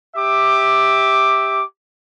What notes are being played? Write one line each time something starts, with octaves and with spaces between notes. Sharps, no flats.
G4 E5 D6